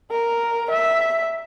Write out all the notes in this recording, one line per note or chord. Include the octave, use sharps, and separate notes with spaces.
A#4
E5